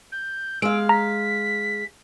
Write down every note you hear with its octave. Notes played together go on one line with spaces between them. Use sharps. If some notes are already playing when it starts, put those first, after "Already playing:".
G6
G#3 F5 E6 D7
A#5 B6